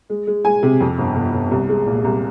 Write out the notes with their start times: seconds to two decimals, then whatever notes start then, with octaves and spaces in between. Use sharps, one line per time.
0.10 G#3
0.27 G#3
0.45 G#3 G#5
0.63 C3
0.80 F2
0.98 G1
1.16 G1
1.33 G1
1.51 C2
1.69 G#3
1.86 A#2
2.04 C2